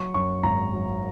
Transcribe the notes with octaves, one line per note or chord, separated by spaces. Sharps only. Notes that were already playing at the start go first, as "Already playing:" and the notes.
Already playing: F#3 C#6
F#2 C#6
G#1 A#5
F#3